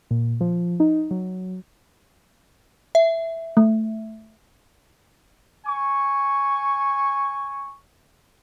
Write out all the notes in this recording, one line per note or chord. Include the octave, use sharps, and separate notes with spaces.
A#2
F3
D#4
F#3
E5
A3
G#5 C#6